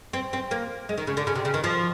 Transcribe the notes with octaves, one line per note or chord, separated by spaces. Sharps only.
C4
C4
A#3
G#3
D#3
C#3
D3
C#3
C3
C#3
D#3
F3